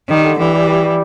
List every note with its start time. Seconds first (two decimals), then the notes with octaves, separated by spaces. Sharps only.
0.09 D#3 G3
0.24 D3
0.38 E3 G3
0.54 G3
0.69 G3
0.83 G3